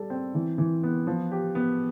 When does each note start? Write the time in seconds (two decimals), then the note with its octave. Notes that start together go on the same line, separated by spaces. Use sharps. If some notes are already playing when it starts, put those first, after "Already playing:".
Already playing: G3 A4
0.10 C4
0.34 E3
0.58 E3
0.83 B3
1.07 F3
1.31 G4
1.55 B3